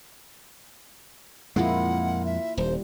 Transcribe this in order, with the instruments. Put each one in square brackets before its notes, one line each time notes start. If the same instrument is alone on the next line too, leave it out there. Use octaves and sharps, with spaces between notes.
[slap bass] F2 A#2 G#3 [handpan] A#3 E4 F4 [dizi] F#5
[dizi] E5
[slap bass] D#1 [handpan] G3 [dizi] C5